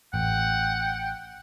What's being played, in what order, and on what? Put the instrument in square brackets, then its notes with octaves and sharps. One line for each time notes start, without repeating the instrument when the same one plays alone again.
[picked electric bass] A1 [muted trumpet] F#5 [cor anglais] G5